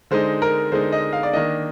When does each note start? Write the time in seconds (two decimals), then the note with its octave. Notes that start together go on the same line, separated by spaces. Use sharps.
0.11 D3 G#3 D#4 C5
0.42 A#4
0.72 D3 G#3 D#4 C5
0.92 D#5
1.13 F5
1.23 D5
1.33 D#3 A#3 D4 D#5